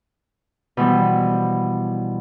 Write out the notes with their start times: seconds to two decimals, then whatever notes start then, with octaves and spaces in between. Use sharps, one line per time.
0.77 B2 E3 F3 G3